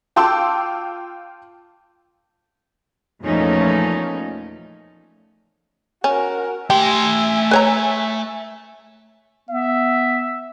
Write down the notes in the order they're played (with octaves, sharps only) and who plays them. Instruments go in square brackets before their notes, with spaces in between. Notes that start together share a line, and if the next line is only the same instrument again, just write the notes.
[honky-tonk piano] F4 G5 A5 C6 D6 E6
[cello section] E2 A#2 F3 A3 C#4 D#4
[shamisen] C#4 [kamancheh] F#4 A#4
[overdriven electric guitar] A3 C6 [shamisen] G4 [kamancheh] E5 G#5
[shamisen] B4 C#5 A#5
[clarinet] B3 [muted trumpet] E5